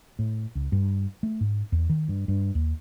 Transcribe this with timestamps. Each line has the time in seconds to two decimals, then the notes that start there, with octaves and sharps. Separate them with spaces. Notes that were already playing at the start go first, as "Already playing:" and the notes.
0.19 A2
0.55 C#2
0.72 G2
1.23 A3
1.41 G#2
1.72 E2
1.90 D#3
2.08 G2
2.28 G2
2.55 D#2